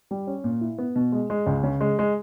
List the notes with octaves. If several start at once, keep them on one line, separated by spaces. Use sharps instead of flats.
G3
C#4
A#2
E4
B3
B2
G#3
G#3
C#2
C#3
G#3
G#3